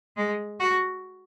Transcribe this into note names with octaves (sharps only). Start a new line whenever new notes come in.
G#3
F#4